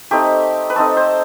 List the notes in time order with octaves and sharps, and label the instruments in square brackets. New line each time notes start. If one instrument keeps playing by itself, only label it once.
[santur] A3 C4 D#4 G4
B4
A3 C4 D#4 A4
C5